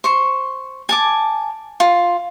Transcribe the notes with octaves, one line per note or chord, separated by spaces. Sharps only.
C5 C#6
G#5 A5 D6
F4